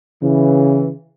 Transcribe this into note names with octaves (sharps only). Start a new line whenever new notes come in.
C#3 E3